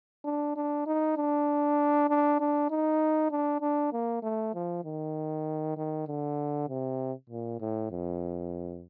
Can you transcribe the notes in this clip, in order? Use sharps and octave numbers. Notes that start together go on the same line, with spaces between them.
D4
D4
D#4
D4
D4
D4
D#4
D4
D4
A#3
A3
F3
D#3
D#3
D3
C3
A#2
A2
F2